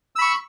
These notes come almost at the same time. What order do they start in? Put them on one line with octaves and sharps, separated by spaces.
E6 B5 C#6